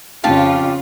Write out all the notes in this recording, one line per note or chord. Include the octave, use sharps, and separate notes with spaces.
F2 C#3 F4 G4 F5 A5